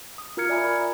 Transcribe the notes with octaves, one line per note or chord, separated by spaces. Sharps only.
D#6
F4 A#4 A#5 F6 G#6 C#7
D5 E5 G#5 A#5 B5
B5